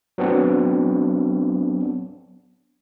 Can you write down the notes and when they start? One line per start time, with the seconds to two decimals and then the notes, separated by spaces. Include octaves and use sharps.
0.18 F#3 B3 C4 D4